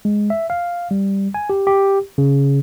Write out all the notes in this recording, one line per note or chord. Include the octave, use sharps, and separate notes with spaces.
G#3
E5
F5
G3
G#5
G4
G4
C#3